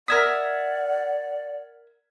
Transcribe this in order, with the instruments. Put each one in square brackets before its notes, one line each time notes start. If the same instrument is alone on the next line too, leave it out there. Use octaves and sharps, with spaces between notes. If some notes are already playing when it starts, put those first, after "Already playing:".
[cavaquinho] A#4 E5 D#6 [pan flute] D5 [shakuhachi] F#5 [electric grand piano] F6 G#6 B6